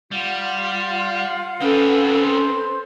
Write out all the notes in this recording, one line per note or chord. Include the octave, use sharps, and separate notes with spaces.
G3 F4 F5 F#5
C4 C#4 D#4 A4 B4
C5 C6